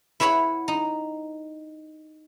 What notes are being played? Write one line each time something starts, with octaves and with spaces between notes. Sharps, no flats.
E4 B4 C#5 F#5 B5
D#4